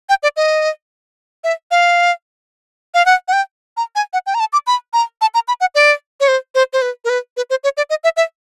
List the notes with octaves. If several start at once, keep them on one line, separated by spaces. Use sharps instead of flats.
G5
D5
D#5
E5
F5
F5
F#5
F#5
G5
A#5
G#5
F#5
G5
A#5
A5
D6
B5
A#5
A5
A#5
B5
F#5
D5
C#5
C5
C5
C5
B4
A#4
B4
B4
C5
C#5
D5
D#5
E5
E5